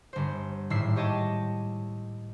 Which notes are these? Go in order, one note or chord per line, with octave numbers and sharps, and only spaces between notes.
G1 C5
G#1 A2 G3 E5 E6 C7
G4 C#5 D#5 G5 A5